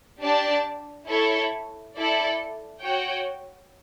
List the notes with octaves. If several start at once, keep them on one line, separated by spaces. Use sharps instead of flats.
D4 G4 D5 A5
E4 A4 C#5
E4 A4 D5
F#4 C#5 G5